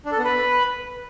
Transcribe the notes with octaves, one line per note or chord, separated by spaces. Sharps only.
D4
A4
B3
B4